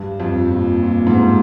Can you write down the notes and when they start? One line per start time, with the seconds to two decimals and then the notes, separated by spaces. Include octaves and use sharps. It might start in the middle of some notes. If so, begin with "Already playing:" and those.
Already playing: G2
0.20 F2
0.51 A#2
0.83 A#2
1.07 G#2